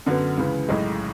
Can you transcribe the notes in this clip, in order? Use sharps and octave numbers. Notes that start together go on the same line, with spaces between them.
F#2 D3 F#3 B3
C#2 C#3 E3
B1 A2 G#3